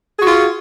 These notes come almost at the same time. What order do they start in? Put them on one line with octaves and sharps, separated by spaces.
G#4 F#4 F4